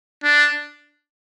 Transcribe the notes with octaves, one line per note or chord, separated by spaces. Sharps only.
D4